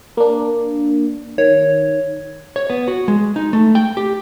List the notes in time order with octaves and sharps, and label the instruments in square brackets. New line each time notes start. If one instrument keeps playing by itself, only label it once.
[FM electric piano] A#3 D4
[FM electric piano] D#3 [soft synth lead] C#5
[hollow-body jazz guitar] C#5
B3
F#4
G#3
D#4
A3
G5
G4